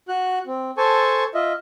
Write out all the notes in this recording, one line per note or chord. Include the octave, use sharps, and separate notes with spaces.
F#4 F#6
C4
A4 C5 G#5 A5 C#6
F4 D#5 E5